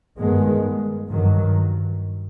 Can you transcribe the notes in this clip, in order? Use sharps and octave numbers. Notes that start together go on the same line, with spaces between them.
G2 D#3 G#3 B3
G2 D#3 F#3